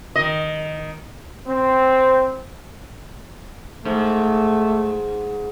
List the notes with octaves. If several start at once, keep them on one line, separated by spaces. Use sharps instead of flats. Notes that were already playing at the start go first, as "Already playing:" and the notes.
D#3 D#5
C4
G#2 A3